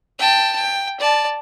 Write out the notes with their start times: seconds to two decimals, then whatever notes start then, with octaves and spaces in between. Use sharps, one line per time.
0.19 G5 A5
0.56 G5
1.00 D5 A5